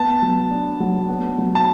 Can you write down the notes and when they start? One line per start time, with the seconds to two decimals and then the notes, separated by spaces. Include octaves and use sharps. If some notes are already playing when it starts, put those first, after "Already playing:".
Already playing: B3 A5
0.22 F#3
0.50 D4
0.80 F#3
1.09 B3
1.38 F#3
1.55 A5